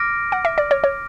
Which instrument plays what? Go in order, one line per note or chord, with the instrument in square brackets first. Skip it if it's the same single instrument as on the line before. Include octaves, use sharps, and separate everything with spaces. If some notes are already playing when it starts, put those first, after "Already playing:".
Already playing: [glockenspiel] D6 F6 A#6 D7
[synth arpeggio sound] F#5
E5
D5
C#5
C#5